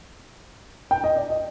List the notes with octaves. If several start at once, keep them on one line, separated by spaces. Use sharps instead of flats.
G5
D#5
D5
D#5